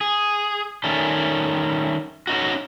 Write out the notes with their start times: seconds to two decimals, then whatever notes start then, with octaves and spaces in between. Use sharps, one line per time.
0.01 G#4
0.84 D#3 G3 A3 C#4
2.27 C#4 D#4 F#4